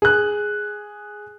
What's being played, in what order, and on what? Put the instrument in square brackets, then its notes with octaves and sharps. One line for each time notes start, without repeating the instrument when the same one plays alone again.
[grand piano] G#4 F#6